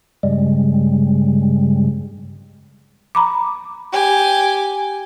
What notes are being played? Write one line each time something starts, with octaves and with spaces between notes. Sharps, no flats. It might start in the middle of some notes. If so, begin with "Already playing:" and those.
G2 C#3 G3 G#3
A#5 B5 D6
G4 G#5